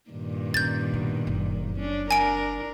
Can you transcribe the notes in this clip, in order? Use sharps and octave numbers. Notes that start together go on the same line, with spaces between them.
G2 A#2 D#3
D3 C#4 G6 A6
B2
F#1
C#4 D4
D4 A#4 G#5 D7